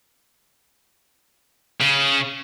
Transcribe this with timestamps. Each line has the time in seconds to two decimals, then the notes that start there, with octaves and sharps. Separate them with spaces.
1.81 C#3